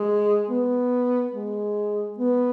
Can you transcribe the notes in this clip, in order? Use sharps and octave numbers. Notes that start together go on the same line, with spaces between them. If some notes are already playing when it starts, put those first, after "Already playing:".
Already playing: G#3
B3
G#3
B3